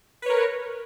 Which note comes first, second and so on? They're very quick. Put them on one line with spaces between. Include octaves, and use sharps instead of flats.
B4 C#5 A#4